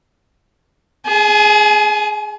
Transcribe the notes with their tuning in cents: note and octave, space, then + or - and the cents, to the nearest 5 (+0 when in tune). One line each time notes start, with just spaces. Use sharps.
G#4 +0 G#5 +40